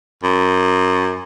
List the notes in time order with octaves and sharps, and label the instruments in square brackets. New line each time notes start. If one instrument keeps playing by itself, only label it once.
[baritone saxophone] F#2